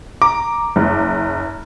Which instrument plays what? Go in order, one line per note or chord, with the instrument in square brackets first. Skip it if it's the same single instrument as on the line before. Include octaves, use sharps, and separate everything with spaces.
[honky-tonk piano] A#5 [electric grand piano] D6
[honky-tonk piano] F#1